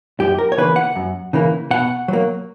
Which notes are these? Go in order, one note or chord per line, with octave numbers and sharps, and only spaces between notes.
F#2 G4
A#4
C#5
C#3 E3 A#3 B4
F#5
F#2
C#3 E3 A#3
B2 F#5
F#3 A#3